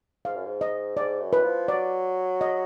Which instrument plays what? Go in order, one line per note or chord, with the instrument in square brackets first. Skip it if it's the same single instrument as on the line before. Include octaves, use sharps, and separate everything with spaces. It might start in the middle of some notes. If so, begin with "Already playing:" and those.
[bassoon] G#2 [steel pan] F5
[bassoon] F#2
G#2
[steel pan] D#5
[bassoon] G#2 [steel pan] D5
[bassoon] F#2
[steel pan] B4
[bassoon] F3
[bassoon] F#3 [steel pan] D5
[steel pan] D#5